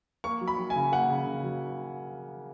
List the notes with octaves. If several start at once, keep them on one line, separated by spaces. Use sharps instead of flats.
A#3 C#6
F#3
B5
F#3
G#5
C#3
A#3 F#5
C#3
C#3
F#3